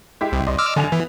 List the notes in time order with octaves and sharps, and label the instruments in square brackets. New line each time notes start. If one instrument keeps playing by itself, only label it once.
[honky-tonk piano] G#3 E4 G4
[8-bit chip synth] C2
[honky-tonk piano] D5 D#5 C6
[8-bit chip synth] D6 E6 F6
[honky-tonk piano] F#2 G#5 F7 [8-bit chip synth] D3
[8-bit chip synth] E3 [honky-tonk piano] B3